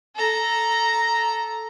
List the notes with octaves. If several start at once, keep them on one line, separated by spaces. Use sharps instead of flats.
A4 A#5